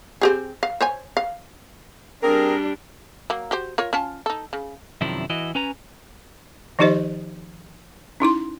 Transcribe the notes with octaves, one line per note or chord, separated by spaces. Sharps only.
C4 G4 G#4
F5
C5 C#5 G#5
F5
G3 C4 D4 G#4 A#4
F#3 A#3
F#4 G4 C5
F4 A#4 C#5
C#4 F4 A5
D#4 A4
C#3
F#2 C3 D#3 F3 D4 E4
E3 E4 F#4 D#5
C#4 B4 G#5 A#5
D#3 F3 D#4 G4 C5 D#5
C#4 D#4 E4 C6